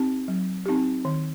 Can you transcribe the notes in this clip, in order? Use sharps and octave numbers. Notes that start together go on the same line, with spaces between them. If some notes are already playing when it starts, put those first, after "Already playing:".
Already playing: C4 D#4 G4
F#3
C4 D#4 G4
D#3